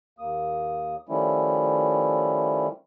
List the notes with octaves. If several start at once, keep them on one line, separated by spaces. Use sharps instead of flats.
D#2 A#3 D#6
D#3 F3 G3 A3 C#4 E4